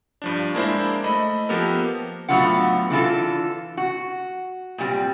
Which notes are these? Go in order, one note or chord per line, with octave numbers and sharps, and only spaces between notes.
G2 F3 D4
G#3 A#3 D4 E4 C5
A3 D#5 B5
F3 A#3 B3 G4 A4 A#4
A2 D3 F#3 B3 F4 F#5
D3 E3 F4 A4
F#4
A#2 G3 C4